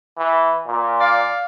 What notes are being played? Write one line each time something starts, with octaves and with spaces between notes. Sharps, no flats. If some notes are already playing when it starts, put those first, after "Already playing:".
E3
A#2
D5 F5